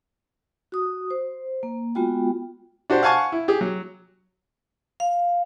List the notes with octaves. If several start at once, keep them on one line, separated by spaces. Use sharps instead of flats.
F#4 D#6
C5
A#3
G#3 B3 F4 F#4 G5
D4 F#4 G4 C5
F5 F#5 G#5 A5 C#6
E4
G4 G#4
F#3
F5